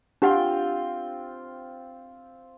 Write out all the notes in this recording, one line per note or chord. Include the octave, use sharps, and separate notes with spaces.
C4 D4 F4 G4 F#5 G5